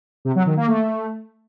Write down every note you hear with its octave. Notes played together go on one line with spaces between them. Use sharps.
C3
F#3
D#3
A#3
A3